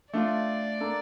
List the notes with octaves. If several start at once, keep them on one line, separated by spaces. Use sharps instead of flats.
A3 D4 F4 D5
A#3 D4 A4